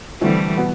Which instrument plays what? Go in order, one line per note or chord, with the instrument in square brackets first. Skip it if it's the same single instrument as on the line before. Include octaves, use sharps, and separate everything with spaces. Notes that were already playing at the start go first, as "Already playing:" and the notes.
[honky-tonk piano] D3 A3 C4 E4 [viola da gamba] E3 G3
[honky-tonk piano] B2 B3